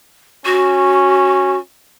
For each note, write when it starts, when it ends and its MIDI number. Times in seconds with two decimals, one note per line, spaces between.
0.46 1.58 61
0.46 1.58 66